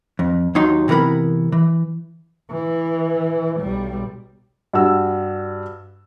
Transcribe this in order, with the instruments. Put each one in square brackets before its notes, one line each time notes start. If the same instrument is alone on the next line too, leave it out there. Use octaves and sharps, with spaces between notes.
[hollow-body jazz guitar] F2
D#2 F#3 D#4 C6
C3 E3 B3 A#4 B5
E3
[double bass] E3
B1 G3
[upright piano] G2 F#4 E6